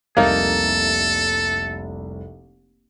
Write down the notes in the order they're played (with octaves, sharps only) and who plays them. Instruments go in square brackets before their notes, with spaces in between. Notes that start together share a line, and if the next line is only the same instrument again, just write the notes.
[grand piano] F1 C2 [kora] A#3 D#4 [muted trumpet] A4